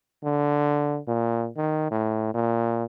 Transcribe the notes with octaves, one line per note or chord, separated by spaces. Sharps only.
D3
A#2
D#3
A2
A#2